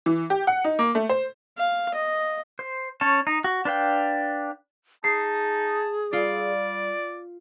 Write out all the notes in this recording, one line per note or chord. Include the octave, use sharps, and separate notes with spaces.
E3
G4
F#5
D#4
A#3
A3
C5
F5
D#5
C5
C#4 C#5 A5
D#4
F#4
D4 B4 F5 G5
D#4 G#4 A5 C7
G3 F4 D5